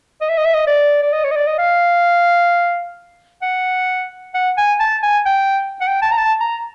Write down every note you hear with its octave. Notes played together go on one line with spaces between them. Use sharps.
D#5
E5
D#5
E5
D#5
D5
D5
D#5
C#5
D#5
D5
D#5
F5
F#5
F#5
G#5
A5
G#5
G5
F#5
G5
A5
A#5
A5
A#5